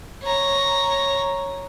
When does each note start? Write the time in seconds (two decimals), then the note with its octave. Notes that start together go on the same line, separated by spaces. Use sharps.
0.23 C#5 A#5